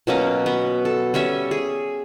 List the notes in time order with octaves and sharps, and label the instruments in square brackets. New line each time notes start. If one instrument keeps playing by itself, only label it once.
[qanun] B2 F#3 A#3 C#4
B3
A4
G3 C#4 C#5 E5
G#4